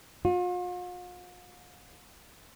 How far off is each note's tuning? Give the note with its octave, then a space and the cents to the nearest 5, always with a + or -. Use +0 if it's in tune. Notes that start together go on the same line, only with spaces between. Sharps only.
F4 +45